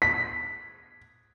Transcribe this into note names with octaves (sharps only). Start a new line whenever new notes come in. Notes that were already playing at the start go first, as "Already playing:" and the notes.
B6